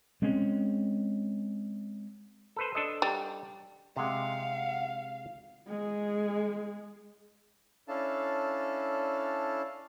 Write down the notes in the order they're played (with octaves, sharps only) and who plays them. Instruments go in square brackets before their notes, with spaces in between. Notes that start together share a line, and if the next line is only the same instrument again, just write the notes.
[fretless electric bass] G#3 C4 C#4
[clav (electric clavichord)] A4 B4 C5
D4 A4 D#5
[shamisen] G3
[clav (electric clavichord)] C3 G#3 [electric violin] F5 [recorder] F#5
[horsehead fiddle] G#3 G#4
[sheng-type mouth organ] C#4 D4 E4 A4 F5 A5